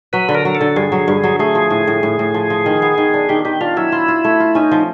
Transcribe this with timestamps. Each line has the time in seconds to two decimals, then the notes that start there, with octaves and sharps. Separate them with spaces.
0.13 F#3 B4
0.29 D3
0.35 A#4
0.45 F#3
0.55 A4
0.61 D3
0.76 G2 G#4
0.92 F#3
1.08 G2
1.24 F#3
1.39 A3 G#4
1.55 F3
1.71 A2
1.88 A2
2.03 A2
2.19 A2
2.34 F3
2.50 F3
2.66 D#3
2.82 B3
2.98 D#3
3.14 D4
3.29 D#3 G4
3.45 D#3 G4
3.61 D4 F4
3.77 F#3 E4
3.92 F4
4.08 F4
4.25 A3
4.40 F4
4.55 C#4 D#4
4.71 F3